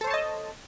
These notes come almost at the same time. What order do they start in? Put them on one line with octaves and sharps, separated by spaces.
A4 C5 C#5 A5 D#5